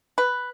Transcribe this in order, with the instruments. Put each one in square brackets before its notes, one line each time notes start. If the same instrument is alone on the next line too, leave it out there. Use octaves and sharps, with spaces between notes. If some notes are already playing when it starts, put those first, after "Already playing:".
[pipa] B4